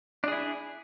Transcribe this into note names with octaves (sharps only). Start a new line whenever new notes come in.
D4 E4 G#4